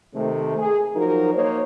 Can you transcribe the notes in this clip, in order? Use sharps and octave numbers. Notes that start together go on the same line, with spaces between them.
C3 D#3 A3
G#4
F3 F#3 D#4 F#4 A#4
A#3 D#4 C5 C#5